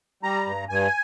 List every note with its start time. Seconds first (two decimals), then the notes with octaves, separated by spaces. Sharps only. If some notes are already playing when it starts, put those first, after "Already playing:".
0.23 G3 A#5
0.46 G2
0.69 G2 G#5